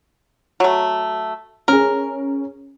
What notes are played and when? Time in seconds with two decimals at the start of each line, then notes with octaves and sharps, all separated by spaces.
0.60 F#3 A3
1.68 C#4 G#4 A#4